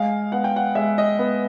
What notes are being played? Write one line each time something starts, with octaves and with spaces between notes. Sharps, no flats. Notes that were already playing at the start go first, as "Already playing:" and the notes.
Already playing: G#3 F5
B3 F#5
G5
F#5
G#3 E5
D#5
B3